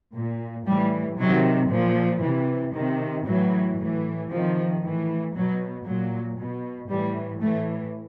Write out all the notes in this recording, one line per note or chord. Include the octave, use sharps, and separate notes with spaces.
A#2
A2 E3 G3
C3 D#3 F#3
A#2 F3
C3 E3
C3 D#3
A2 E3 F#3
A2 E3
C3 D#3 F3
A2 E3
B2 F#3
A#2 F#3
B2
A2 E3 G3
A2 E3 A3